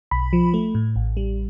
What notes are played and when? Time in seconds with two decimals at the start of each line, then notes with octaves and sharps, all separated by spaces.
0.11 B1 B5
0.33 F3
0.54 A3
0.75 A2
0.96 A1
1.17 G3